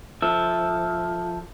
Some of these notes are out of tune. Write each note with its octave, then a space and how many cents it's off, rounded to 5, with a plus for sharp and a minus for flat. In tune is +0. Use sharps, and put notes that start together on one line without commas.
F3 +0 A4 +0 E5 -5